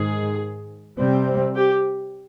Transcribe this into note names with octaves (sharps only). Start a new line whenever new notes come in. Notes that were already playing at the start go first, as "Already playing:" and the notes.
Already playing: G#2 D#3 G#3 G#4
C3 G3 C4
G4